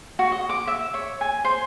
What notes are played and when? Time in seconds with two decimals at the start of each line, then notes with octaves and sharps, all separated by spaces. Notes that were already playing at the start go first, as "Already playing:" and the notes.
0.19 F#4
0.32 D#5
0.49 D6
0.68 E5
0.94 C#5
1.21 G#5
1.45 C5